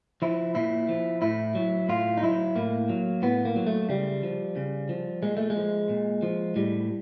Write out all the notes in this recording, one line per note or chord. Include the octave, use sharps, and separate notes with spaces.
F3 E4
A#2 E4
F3
A2 E4
F#3
A2 F4
D#4
F#3 E4
A2 A#3
F#3
A2 B3
A#3
F#3
A3
C#3 G3
F3
C#3
F3
A#2 G#3
A3
G#3
F3
A#2
F3
A2 G3